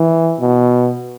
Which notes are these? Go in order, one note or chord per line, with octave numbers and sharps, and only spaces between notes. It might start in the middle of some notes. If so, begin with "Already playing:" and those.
Already playing: E3
B2